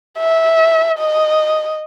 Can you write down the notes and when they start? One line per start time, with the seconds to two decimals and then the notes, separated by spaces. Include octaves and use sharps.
0.20 E5
0.99 D#5